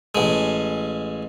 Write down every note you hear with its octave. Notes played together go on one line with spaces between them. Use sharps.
A1 G#3